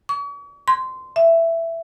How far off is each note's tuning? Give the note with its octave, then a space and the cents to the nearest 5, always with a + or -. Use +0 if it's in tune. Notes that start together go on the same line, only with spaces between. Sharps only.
C#6 +45
C6 -15
E5 +10